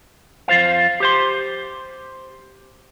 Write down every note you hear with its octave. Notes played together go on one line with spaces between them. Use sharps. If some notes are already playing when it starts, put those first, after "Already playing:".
F2 F4 C5 F5
G4 C5 C6